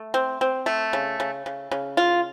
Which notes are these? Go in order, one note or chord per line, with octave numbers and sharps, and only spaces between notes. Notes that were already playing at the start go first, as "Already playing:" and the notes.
Already playing: A3
C4
C4
A3
C#3
C#3
C#3
C#3
F4